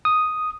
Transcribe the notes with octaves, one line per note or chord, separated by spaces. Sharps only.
D#6